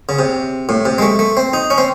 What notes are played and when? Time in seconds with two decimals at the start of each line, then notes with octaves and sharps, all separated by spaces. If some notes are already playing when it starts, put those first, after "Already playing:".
0.09 C#3
0.19 C3
0.69 A2
0.85 C3
0.98 G#3
1.02 A3
1.19 A3
1.37 C4
1.53 D#4
1.70 C#4
1.78 C4